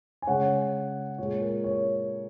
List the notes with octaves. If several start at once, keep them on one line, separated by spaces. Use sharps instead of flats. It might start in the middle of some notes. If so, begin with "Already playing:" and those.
G#5
C#3 G#3 C#5 F#5
A#2 G#3 C#5
A#4
C#5